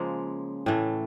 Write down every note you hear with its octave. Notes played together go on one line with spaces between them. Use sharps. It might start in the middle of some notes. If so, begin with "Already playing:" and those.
Already playing: C#3 F3 G#3 A#3
A2 E3 A3